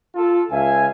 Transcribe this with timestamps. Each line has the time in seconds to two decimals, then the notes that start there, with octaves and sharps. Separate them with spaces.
0.15 F4 A4
0.51 C#2 E5 F5 G#5